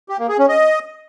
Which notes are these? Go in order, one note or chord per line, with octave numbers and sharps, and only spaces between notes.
G4
A#3
G#4
C#4
D#5